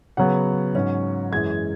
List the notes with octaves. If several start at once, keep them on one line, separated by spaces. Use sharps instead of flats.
C#3 F#3 B3 F#5
G#2 F#3 C#4
F#2 E3 G#3 G#6